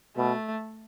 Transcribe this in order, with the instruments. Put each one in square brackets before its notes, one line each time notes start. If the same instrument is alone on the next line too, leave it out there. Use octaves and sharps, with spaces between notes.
[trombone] B2 [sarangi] A3